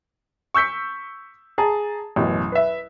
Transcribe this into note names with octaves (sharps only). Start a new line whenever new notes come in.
C#6 E6 G6 B6 C#7
G#4 A5 A#5
A1 F#2 B2
B4 E5